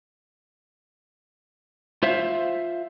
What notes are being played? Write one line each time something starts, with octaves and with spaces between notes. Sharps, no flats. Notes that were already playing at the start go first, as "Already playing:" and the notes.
F4 C5 E5 F5